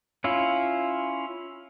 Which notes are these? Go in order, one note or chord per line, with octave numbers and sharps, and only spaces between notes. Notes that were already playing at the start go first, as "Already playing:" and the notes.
C#4 E4 F4